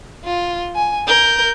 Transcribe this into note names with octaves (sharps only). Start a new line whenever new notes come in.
F4
G#5
A#4 G6